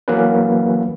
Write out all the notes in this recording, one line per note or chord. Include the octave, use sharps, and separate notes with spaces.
E3 F#3 A#3 B3 C#4 B4